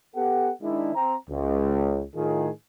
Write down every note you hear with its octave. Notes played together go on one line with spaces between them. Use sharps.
B3 G4 A4 F#5
D#3 G#3 D4 E4
C4 A#5
C#2
A2 D#3 F4 G#4